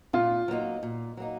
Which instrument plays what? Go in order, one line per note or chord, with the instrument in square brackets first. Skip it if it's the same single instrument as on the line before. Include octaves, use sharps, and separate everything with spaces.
[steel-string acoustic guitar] A#2 [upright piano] F4
[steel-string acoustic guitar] F#3 A#3 D#4
A#2
F#3 A#3 D#4